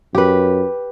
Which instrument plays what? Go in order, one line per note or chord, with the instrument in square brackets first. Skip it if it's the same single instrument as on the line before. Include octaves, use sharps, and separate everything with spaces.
[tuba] F#2 [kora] G4 B4